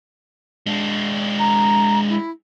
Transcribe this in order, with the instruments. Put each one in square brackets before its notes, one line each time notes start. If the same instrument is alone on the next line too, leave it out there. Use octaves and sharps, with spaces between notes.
[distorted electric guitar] G#3 D4
[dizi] A#5
E4